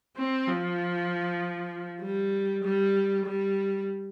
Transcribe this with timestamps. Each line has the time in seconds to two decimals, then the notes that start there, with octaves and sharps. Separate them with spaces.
0.17 C4
0.48 F3
2.01 G3
2.64 G3
3.26 G3